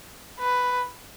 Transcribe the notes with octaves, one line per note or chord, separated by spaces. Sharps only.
B4